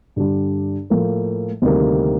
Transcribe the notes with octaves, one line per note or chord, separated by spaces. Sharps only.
G2 D3 G3 D4
A2 F3 A#3
D2 C3 D#3 G3 A#3